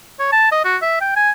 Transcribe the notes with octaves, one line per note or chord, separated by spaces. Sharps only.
C#5
A5
D#5
F#4
E5
G5
G#5